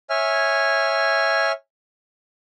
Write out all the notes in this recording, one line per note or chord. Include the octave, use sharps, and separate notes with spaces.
C#5 E5 G#5 F6